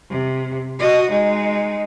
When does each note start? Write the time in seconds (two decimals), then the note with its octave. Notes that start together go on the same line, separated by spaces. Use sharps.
0.10 C3
0.79 F#4 D#5
1.11 G#3 D#4